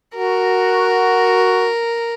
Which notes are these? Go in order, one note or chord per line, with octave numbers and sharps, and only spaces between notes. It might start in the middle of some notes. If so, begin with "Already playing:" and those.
F#4 A#4